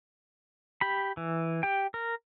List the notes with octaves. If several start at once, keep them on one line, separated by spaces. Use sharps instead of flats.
G4 B5
E3
G4 G5
A#4